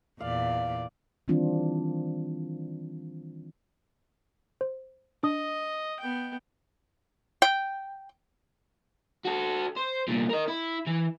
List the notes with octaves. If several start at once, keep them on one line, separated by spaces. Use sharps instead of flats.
E2 A#2 D5 F5
D#3 E3 G3 C4 D4 F4
C5
D4 D#5 D#6
B3 G5
G5
F#4 A4
C5
C2 A#2
A#4 D#5
E4
E3